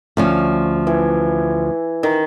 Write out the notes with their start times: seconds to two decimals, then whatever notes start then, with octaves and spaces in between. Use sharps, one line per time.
0.17 D2 F3 C#4
0.87 E3
2.03 D#3